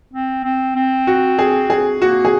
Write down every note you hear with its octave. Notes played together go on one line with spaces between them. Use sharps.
C4
C4
C4
F#4
G#4
G#4
A#3 F#4
G#4